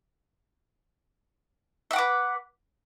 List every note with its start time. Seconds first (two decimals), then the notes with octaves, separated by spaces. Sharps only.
1.91 E5
1.93 F#5
1.96 D6
1.99 B4